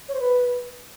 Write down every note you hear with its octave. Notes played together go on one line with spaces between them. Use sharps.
C#5
C5
B4